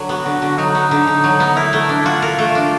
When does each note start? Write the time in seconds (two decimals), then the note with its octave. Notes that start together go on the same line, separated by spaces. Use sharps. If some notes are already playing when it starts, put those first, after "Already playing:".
Already playing: D3 F#3
0.09 B3 F#4
0.25 D3
0.42 D3
0.58 F#3 D#4
0.75 B3
0.91 D3
1.07 D3
1.24 F#3
1.40 B3
1.57 E4 A#4
1.73 A3
1.89 D4
2.05 F4 F#4
2.22 A#4
2.38 A3
2.55 D4